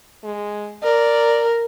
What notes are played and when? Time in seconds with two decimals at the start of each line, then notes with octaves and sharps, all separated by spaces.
0.24 G#3
0.83 A#4 D5